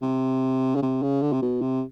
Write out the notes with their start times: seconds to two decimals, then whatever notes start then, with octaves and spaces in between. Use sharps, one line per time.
0.02 C3
0.75 C#3
0.82 C3
1.02 C#3
1.22 D3
1.33 C3
1.42 B2
1.61 C3